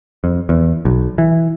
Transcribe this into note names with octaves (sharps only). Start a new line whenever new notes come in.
F2
E2
B1
E3